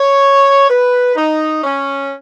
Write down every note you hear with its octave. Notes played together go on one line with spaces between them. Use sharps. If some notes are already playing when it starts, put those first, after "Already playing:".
Already playing: C#5
B4
D#4
C#4